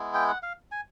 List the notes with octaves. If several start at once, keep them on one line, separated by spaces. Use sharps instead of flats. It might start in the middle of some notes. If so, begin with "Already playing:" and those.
Already playing: G#3 B3 E4
G5
F#5
F5
G#5